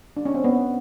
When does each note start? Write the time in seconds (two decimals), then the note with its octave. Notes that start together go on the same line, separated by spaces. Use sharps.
0.17 D4
0.25 C#4
0.34 C4
0.44 B3